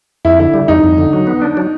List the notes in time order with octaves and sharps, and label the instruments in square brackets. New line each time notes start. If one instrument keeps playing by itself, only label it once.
[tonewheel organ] F2 [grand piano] E4
[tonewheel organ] D3 [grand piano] E4
[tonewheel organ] G3
[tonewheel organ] F2 [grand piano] D#4
[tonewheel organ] F2
D3
F#3
B3
D4
F#3